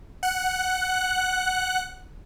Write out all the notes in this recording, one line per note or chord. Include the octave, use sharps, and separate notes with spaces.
F#5 F#6